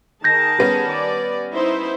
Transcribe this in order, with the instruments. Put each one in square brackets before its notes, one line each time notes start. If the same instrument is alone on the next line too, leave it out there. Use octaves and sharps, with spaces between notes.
[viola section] D#3 G#4 A5 [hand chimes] G6 A#6
[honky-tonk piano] G3 B3 C#4
[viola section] D5
D#4 E4 C5